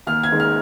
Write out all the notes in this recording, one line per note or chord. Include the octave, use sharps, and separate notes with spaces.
D#2 F6
G#6
D#3 G#3
F6